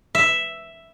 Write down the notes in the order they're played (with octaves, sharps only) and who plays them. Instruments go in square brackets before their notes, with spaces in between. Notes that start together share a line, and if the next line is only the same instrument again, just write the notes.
[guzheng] E5